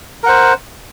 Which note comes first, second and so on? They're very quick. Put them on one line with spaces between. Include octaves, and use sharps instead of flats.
A#4 F#5 C5